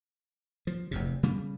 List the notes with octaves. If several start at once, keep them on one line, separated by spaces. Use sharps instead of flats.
F3
F1 E2 C3
C#3 G3 B3